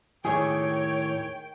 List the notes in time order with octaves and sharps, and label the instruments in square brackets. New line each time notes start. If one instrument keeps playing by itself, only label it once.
[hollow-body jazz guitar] D#2 A2 [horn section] D#3 G5 [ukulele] G#4 [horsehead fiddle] C#5